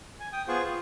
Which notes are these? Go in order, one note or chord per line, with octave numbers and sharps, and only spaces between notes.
G#5
G5 D#6
B3 F4 G#4 C5 F#5 C#6
F4